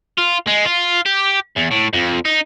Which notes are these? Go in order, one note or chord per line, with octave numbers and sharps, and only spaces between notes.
F4
G#3
F4
G4
E2
A2
F2
D#4